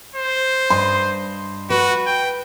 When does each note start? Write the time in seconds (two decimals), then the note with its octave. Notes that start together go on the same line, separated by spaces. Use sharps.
0.16 C5
0.70 G2 D#5 C6
1.70 F#4 B4
2.07 G5